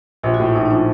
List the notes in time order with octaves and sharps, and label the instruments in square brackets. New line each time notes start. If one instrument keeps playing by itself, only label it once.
[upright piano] A#1 [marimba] G4
[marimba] F#4
[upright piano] A2
[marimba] F4
[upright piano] A#1 [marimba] D#4
[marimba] D#4
[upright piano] F3 [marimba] D4